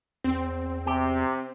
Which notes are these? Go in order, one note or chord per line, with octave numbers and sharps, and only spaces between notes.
E2 C4
C3 G4